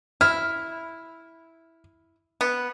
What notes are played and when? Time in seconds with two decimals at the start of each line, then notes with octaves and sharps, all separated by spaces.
0.21 E4 F6
2.41 B3